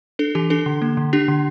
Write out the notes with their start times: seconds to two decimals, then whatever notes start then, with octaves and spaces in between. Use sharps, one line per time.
0.19 D4 A4
0.35 E3 G4
0.50 D4 A4
0.66 D3
0.82 A#3
0.97 D3
1.13 D4 G4
1.28 D3